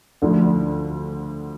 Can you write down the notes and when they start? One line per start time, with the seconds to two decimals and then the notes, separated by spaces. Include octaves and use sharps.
0.22 D2 D3 F3 A3